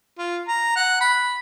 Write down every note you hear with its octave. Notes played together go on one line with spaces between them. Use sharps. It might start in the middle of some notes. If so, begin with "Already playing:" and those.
F4
A#5
F#5
B5